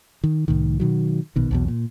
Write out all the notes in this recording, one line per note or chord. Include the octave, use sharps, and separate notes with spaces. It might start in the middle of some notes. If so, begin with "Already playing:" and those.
D#3
C2 A2 D#3
B2 D#3 F#3
A#1 B2 D#3
B1 E2 B2
A#2